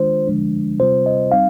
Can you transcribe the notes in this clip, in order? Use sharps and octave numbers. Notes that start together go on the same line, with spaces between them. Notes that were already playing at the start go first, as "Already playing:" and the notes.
Already playing: D#3 G#3 D4 F4 C5
D3 F3 G#3 D4
C3 G3 C4 F4 C5
D#5
G3 C4 D#4 F5